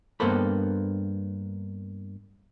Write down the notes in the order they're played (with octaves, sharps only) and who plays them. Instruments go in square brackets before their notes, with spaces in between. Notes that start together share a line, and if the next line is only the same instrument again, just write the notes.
[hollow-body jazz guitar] G2 A#3 B3 A4 C5 B5